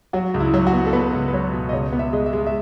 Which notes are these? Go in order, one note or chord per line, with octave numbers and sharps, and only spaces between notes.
F#3 F#4
C#2
E4
F#3
F#4
B3
A4
B3 B4
C#2
B4
F#3 C#5
B2
D#5
C#2 C#5
B3
E5
G#3 D#5
E5
G#3
E5